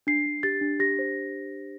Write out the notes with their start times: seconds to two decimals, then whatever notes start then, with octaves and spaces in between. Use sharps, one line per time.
0.07 D4 C7
0.26 D4
0.43 G4 A6
0.61 D4
0.79 G4 A#6
0.99 C5